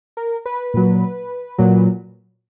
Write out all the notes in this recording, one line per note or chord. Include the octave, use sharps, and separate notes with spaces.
A#4
B4
A#2 F#3
A#2 F#3